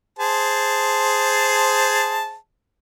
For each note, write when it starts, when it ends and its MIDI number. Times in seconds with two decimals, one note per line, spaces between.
0.19 2.35 68
0.19 2.35 72
0.19 2.35 81